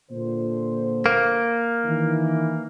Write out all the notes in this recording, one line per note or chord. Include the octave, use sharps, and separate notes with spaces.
A#2 D3 C5
A#3
D#3 E3